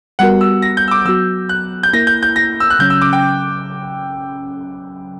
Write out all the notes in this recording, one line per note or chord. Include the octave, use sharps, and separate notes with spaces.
G3 B3 F#4 A#4 F#5
E6
A#6
G6
E6
D6
F#3 B3 F#4 E6
F#6
G6
A#3 E4 A#4 A#6
G6
G6
A#6
E6
F#6
C#3 F#3 C#4 G6
E6
D6
G5